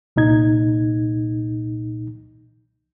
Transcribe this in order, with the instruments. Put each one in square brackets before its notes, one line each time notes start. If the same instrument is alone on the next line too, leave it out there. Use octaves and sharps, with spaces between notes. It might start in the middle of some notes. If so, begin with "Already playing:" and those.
[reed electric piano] C2 A#2 D#4 G#6